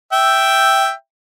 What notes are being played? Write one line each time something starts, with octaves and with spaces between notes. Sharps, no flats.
E5 G5